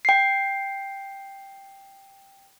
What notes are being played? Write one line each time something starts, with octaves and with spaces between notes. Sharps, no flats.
G5 C7